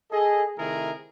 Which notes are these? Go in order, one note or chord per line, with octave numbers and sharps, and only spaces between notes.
G#4 A4 D#5
C3 D#3 A3 E4 G#4 A#4